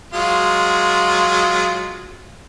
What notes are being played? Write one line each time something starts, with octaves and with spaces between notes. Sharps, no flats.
F#3 G#3 F4